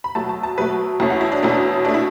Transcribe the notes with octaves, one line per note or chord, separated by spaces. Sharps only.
B5
B2 F#3 A3 A5
A5
A5
B2 F#3 A3 B4
E2 B2 A3 C#4
F#4
E4
D4
E2 B2 A3 C#4 D4
B2 A3 D4
E4